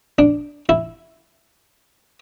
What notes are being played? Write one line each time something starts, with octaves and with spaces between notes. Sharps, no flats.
D4
E4